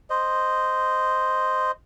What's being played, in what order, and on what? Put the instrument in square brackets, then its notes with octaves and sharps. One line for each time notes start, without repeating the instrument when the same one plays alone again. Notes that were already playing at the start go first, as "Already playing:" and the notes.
[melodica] C5 D#5